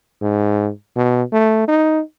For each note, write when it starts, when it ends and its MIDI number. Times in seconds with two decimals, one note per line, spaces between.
0.22 0.70 44
0.96 1.23 47
1.32 1.66 57
1.68 2.01 63